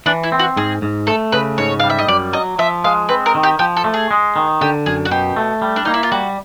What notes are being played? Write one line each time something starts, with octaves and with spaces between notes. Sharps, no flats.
E3 D4
E4
C4
F#4
G#2 G#4
G#2
A3 A4
C#3 B4
G#2 C#5
G3 F5
E5
D#5
F#2 D5
F#3 D#5
F3 E5
G#3 F5
C4 B4
A#4
D#3
G4
F3 G4
A4
A3
G#4
G#3
D#3
D3 G4
F#2 G#4
F#4
B2 G4
A3
G3
D4
A#3 D#4
E4
F4
G3 F#4